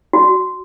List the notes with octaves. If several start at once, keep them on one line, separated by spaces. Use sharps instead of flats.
F#4